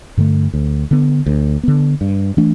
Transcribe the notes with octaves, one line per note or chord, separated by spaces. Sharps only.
G2 D3 A3
D2
D3 B3
D2
D3 B3
G2
E3 A3 D4